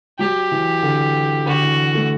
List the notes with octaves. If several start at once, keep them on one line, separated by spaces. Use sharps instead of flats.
F#3 G4
E3
D3
D3 F#4
E3
A3